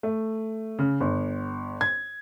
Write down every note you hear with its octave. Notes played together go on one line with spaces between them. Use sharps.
A3
C#3
G1
G#6